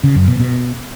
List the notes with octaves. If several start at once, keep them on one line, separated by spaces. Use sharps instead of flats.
C#3
F#2
B2
B2